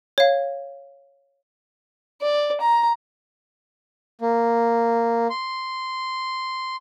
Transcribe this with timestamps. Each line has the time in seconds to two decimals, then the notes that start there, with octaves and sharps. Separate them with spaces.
0.18 C#5 F5
2.22 D5
2.61 A#5
4.21 A#3
5.30 C6